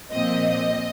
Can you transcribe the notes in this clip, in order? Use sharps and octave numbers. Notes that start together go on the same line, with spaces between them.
A#2 F3 C4 D#5
D#5